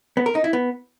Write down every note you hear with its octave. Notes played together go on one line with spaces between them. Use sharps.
B3
A#4
D#4
E4
B3